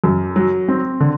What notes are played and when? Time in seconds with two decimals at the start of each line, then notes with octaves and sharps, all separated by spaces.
0.04 F#2
0.36 F#3
0.68 C4
1.00 D3